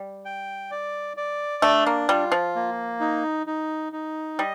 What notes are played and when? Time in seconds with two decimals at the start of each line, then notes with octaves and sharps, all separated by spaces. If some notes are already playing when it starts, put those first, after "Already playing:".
Already playing: G3
0.25 G5
0.71 D5
1.17 D5
1.62 A3 D4
1.87 A#3
2.09 G3 F4
2.32 F3
2.55 A#3
3.00 D#4
3.47 D#4
3.93 D#4
4.39 G3 D#5